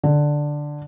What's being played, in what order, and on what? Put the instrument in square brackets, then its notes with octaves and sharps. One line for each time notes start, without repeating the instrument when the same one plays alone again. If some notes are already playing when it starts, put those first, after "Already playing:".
[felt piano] D3